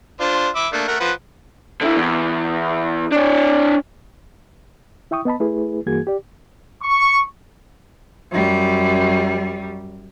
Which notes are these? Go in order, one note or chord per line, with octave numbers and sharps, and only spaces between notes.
D4 F4 C5
E5 B5 D6
A3 A#3 D4
A3 A#4 F#5
F3 B4 F#5
D3 E4
E2
D4 C#5
E4 E5 G5 C#6 D#6
B3 D#5 A5 B5
A3 E4 G#4 B4
G2 E3 A#3 F#4 G#4 G#6
G4 D5
C#6
F#2 G3